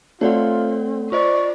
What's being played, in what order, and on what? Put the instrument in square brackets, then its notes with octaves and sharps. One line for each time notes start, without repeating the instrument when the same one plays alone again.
[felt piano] A3 [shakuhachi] C4 [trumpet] F4 [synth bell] C#5 D5 F#5
[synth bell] F4 C5 D#5 [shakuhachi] D5 [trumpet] C#6